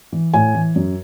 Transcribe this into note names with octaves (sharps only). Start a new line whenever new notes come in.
E3
A2 G#5
E3
F#2